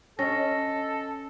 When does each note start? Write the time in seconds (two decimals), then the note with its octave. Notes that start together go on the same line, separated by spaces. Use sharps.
0.19 C#4 A4 D#5 A#6